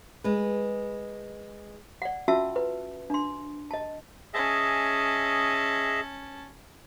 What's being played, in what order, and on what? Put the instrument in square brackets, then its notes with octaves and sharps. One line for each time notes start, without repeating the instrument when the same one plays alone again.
[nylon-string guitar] G#3 B4
[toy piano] D5 F#5
C#4 F4 F#4 E5 A5 E6
B4
D4 C6
D#5 A5
[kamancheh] C#4 A5 [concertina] G#4 D#5 E5